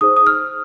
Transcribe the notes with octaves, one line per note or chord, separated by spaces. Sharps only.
D#4 G#4 C5 D#6
D#6
F6